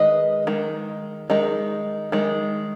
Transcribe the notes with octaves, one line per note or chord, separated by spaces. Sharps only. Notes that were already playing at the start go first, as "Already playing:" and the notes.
Already playing: D#3 G#3 B4 D#5
D#3 G#3
D#3 G#3 D#4
D#3 G#3